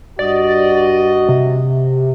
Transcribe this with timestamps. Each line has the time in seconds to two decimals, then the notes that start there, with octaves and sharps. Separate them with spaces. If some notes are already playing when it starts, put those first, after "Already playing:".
0.19 G2 F#4 D5 D#5
1.29 C3